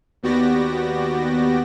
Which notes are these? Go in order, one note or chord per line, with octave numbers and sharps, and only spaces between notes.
D#2 B3 F#4 G4 D5 A#6